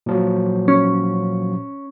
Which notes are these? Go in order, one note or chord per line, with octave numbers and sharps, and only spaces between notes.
A#2 F3 F#3
C#4